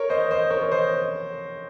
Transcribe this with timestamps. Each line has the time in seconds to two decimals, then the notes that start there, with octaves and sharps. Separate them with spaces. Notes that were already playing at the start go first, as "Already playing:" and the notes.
Already playing: A#4 C#5
0.10 C5 D#5
0.31 C5 D#5
0.50 A#4 C#5
0.62 C#5
0.72 C5 D#5